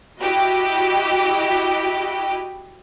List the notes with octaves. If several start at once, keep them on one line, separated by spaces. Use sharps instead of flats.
E4 F#4 G4 D#5